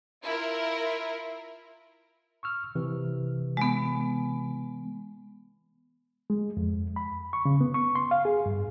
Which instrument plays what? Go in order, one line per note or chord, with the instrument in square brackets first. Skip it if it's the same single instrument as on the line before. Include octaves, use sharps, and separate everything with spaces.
[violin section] E4 F4 A#4
[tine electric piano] C#6 E6 F6
C3 E3
[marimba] G#3 B3
[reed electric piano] G#3
F2
B5
C#6
C#3
B3
C#6
C6
F5
G#4
G2